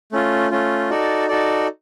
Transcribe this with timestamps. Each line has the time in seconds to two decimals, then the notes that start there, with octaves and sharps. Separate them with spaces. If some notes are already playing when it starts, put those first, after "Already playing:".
0.12 A3 C#4 F4
0.51 A3 C#4 F4
0.90 D#4 F#4 A4 D5
1.28 D#4 F#4 A4 D5